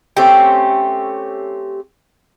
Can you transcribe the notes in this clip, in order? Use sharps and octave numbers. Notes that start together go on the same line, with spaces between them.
A3 C4 C#4 G4